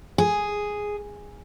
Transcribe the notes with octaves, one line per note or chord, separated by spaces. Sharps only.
G#4